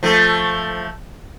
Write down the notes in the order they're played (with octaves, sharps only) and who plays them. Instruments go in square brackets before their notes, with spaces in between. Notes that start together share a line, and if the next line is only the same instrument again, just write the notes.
[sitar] F3 A3